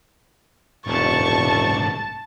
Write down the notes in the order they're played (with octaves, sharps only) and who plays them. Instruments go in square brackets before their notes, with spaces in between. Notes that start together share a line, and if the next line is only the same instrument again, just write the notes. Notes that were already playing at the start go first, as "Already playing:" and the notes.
[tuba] E1 [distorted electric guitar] C2 G#2 [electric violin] A5 A6 [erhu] C#6